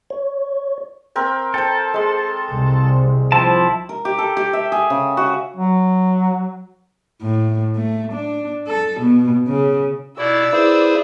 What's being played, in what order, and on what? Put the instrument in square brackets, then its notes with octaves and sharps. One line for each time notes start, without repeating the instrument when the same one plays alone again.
[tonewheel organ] C#5
[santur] C4 A#4 G5
[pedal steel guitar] A4 [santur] C5 G5
[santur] G#3 C6
[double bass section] C2
[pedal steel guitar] F3 E4 A5 [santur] C4
[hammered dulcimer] A#4
G4
A4
G4
E5
G#4
C#3
F#4
[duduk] F#3
[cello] A2
A3
D4
A4
B2
C#3
[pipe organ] B2 E4 [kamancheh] D5 E6
[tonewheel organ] E4 B4 [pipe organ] G#4 C5